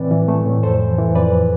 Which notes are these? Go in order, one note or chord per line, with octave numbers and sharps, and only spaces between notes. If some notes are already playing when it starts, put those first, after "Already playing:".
Already playing: A2 E3 C4 B4 D5
E3
A3
A2
F2 A4 C5
E3
E3
F2 B4 D5